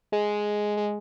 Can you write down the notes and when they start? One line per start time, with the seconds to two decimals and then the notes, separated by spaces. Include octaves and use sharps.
0.12 G#3
0.77 G#3